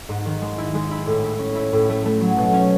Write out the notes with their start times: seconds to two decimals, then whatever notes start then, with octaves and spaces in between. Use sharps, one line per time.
0.09 G#2
0.26 D#3
0.41 G#3
0.58 E4
0.75 G#3
0.91 E4
1.07 A2
1.24 E4
1.39 C#4
1.56 E4
1.73 A2
1.89 A3
2.06 A3
2.21 F#3
2.37 B2
2.53 C#4